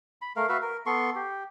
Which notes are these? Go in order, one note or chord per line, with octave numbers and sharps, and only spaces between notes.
B5
A3 A#4 F5
F#4 B4 E5 F5
A#4
B3 A4 C6 C#6
G4